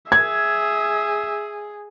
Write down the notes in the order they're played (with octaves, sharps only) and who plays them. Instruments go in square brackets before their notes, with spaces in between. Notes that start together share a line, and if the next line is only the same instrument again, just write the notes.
[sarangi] G#4 [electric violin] E5 [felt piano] G#6